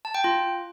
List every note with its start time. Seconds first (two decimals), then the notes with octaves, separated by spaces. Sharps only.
0.05 A5
0.15 G5
0.24 F4